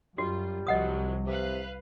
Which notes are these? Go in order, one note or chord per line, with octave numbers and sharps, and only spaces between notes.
F#2 G3 F4 F#4
C2 F3 F#3 D#5 F#5 D#6
C3 B4 F5 F#6